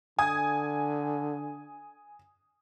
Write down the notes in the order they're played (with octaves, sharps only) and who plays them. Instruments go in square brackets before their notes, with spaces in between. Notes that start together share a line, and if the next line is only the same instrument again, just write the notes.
[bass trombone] D3 [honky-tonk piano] G#5 D#6 G#6